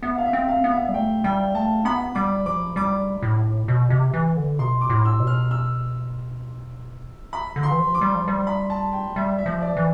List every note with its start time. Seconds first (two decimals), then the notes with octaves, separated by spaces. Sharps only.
0.03 B3 E5
0.18 F5
0.25 E5
0.33 C4
0.48 F5
0.64 B3
0.71 E5
0.89 G3
0.94 A3 G5
1.24 G3 G5
1.54 A3 A5
1.85 B3 B5
2.15 G3 D6
2.46 F3 D6
2.76 G3 D6
3.23 A2
3.68 B2
3.90 C3
4.14 E3
4.37 D3
4.59 B2 C6
4.81 D6
4.90 A2
5.05 E6
5.20 B2
5.27 F6
5.51 E6
7.33 B5
7.56 D3
7.63 C6
7.71 E3
7.79 F3
7.95 D6
8.01 G3
8.15 F3
8.28 G3
8.47 B5
8.70 A5
8.92 G5
9.16 G3 E5
9.38 E5
9.46 F3
9.62 D5
9.77 E3